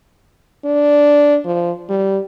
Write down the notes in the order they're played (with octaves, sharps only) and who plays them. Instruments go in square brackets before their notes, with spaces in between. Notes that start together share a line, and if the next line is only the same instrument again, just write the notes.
[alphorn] D4
F3
G3